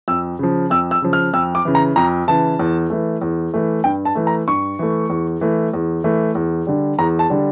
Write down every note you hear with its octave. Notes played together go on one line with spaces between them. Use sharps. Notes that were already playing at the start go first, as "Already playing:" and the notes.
F2 E6
C#3 F3
F2 E6
E6
C#3 F3
F6
F2 E6
D6
C#3 E3
A#5
F2 A#5
C#3 E3 A5
E2
E3 A3
E2
E3 A3
G2 G5
A5
E3 A3
A#5
G2 C#6
E3 A3
E2
E3 A3
E2
E3 A3
E2
D3 G3
E2 A#5
A5
D3 G3